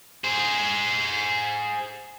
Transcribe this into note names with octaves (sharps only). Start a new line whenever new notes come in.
G#4 C5